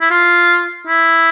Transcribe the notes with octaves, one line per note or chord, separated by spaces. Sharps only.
E4
F4
E4